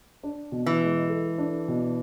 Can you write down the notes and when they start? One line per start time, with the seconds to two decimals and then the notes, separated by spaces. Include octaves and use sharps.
0.23 D4
0.52 B2
0.66 E3
0.81 G#3
1.09 A4
1.38 D4
1.68 B2